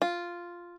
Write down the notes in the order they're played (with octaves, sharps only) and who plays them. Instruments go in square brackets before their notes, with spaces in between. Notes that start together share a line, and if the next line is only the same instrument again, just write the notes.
[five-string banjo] F4